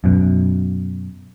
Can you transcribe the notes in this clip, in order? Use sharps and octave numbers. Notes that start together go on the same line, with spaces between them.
F#2 B2